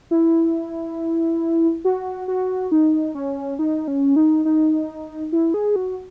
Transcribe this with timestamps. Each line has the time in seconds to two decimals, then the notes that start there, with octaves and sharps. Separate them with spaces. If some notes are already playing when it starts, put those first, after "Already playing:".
0.11 E4
1.85 F#4
2.28 F#4
2.72 D#4
3.15 C#4
3.59 D#4
3.88 C#4
4.16 D#4
4.45 D#4
5.32 E4
5.54 G#4
5.76 F#4